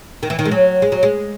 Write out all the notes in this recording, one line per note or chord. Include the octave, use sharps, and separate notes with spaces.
D#3
E3
D#3
G#3
F#3
G#3
F#3
G#3